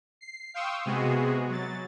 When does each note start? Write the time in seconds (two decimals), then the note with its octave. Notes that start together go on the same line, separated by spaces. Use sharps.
0.21 C7
0.54 F5 G5 C6 C#6 D#6 E6
0.85 C3 G#3 B3 F#4 G#4
1.48 F#3 A6